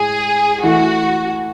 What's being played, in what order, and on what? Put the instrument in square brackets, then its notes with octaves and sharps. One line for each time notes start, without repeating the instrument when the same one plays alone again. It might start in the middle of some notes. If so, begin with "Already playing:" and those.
Already playing: [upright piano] A2 G#3 [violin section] G#4
[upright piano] E3 A3 E4 [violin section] F#4